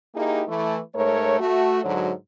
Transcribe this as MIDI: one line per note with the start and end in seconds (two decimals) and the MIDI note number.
0.15 0.44 58
0.15 0.44 63
0.15 0.44 64
0.15 0.44 67
0.15 0.44 68
0.48 0.78 52
0.48 0.78 57
0.94 1.37 44
0.94 1.37 57
0.94 1.37 70
0.94 1.37 73
1.40 1.81 57
1.40 1.81 66
1.83 2.12 44
1.83 2.12 50
1.83 2.12 54